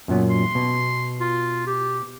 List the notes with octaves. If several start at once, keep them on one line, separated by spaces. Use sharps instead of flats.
F#2 A#2 F#3 B3
C6
B2
F4
G4